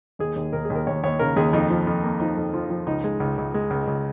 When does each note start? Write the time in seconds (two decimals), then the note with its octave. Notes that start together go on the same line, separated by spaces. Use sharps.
0.19 D#2 G#4
0.36 D#2
0.53 D#2 A#4
0.65 G#4
0.70 D#2
0.75 A#4
0.87 D#2 C#5
1.03 D#2 C#5
1.19 C#3 A#4
1.36 D#2 G#4
1.53 F2 D#4
1.70 F3
1.87 F2
2.04 A#3
2.20 F3 D#4
2.37 F2
2.54 F3 F4
2.70 F3
2.86 C#2 D#4
3.04 G#3
3.20 C#2
3.37 C#2
3.54 G#3
3.70 C#2
3.87 C#2